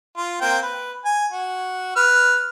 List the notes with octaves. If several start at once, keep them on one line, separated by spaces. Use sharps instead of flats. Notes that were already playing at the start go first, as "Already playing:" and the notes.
F4
A#3 C4 G5
B4
G#5
F#4
B4 F6